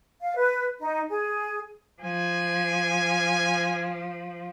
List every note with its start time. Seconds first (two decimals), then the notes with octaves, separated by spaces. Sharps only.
0.21 F5
0.36 B4
0.78 D#4
1.08 G#4
2.02 F3 G#5